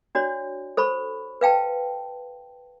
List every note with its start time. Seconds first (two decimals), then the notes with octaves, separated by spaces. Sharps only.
0.15 D4 F#4 C#5 D5
0.77 A4 C5 B5 C#6
1.41 B4 F5 G5 A5